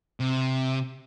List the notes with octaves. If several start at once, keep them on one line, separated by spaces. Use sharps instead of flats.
C3